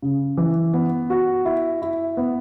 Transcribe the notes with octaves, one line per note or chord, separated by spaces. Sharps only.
C#3
E3
B3
F#4
E4
E4
B3